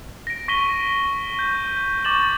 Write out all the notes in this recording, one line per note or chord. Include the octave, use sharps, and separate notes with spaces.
A#6 D7
C#6 A#6 B6 D7 D#7 G7
G6
C#6 D6 A6 E7 F#7